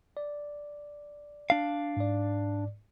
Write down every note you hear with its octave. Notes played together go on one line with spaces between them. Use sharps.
D5
D4 F5
G#2 D5